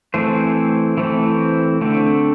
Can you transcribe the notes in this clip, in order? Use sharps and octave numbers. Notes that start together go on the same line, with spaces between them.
E3 A3 C4 C5
E3 A3 C4
D3 A3 C4